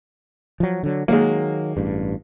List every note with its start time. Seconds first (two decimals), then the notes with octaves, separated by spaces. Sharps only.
0.60 F3 F#3
0.83 D3 F#3
1.08 D#3 F#3 G#3 A#3
1.77 A1 G2